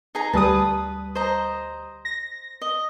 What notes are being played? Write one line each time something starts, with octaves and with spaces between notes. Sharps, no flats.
D#4 G#4 A#5
D2 G3 B4 A5 D#6
C5 D#5 A#5
A#6
D#5